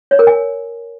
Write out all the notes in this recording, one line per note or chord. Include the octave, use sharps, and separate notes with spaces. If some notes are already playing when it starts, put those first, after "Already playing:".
C#5
A#4
G#5